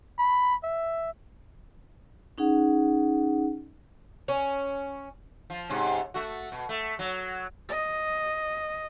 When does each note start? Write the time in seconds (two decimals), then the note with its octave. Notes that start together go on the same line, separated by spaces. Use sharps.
0.18 B5
0.64 E5
2.38 C#4 D#4 G#4 F#5
4.28 C#4
5.50 F3
5.70 G#2 C3 C#4
6.14 A3 F#4
6.52 B2
6.69 A3
6.99 F#3
7.68 D#5